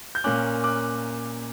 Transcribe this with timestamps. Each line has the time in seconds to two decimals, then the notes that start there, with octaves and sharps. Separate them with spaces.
0.15 G6
0.24 A#2 A#3 C#4 D6 F#6
0.64 D6 F#6